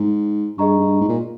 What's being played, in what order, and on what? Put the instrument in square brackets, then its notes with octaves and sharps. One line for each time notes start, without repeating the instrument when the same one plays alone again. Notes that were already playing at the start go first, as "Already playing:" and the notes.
Already playing: [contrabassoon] G#2
[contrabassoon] G2 [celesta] G#4 D#5 A#5 C#6
[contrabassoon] G2
G#2
A#2